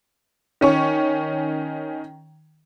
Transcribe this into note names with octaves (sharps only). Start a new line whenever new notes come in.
D#3 C#4 C#6